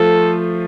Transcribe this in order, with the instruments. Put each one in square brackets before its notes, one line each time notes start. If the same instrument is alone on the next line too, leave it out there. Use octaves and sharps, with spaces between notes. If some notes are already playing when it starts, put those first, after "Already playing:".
Already playing: [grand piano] F3 A3 F4 C5 [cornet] A4